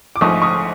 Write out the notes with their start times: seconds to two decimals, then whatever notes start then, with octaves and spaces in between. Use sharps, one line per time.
0.16 D6
0.21 A#1 G#2 F3 A3 C#6 D#6
0.42 C#6 D#6